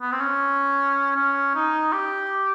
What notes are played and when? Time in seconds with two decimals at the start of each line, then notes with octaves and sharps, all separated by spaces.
0.01 B3
0.12 C4
0.21 C#4
1.16 C#4
1.55 D#4
1.93 G4